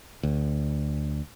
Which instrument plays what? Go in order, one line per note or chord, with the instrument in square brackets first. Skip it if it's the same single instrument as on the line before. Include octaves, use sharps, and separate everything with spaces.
[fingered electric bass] D2